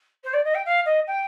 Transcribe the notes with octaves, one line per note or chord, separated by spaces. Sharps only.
C5
D5
D#5
G5
F5
D#5
G5